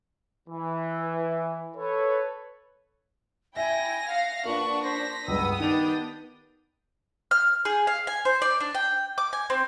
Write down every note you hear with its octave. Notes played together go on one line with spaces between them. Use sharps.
E3
A4 B4 C#5
E4 E5 G5 G#5 A#6
F5 F#5
A#3 D4 F4 A#4 B4 F#5 C#6
C5 A#6 B6
C#2 G2 B3 D#6 E6
D#3 D4 G4 G5 F7
F6
G#4
F5
G#5
C5
D5
D4
G5
D6
G#5
C4